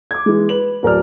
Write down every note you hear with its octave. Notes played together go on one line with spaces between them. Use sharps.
D6 G#6
E3 G#3
B4 F#7
D1 A#4 D5 F6